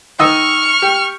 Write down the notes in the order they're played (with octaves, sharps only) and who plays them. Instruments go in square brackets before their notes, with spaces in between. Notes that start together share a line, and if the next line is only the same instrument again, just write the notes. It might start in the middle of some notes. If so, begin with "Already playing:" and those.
[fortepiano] D#3 D#5 E6 [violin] C#6 F6
[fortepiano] G4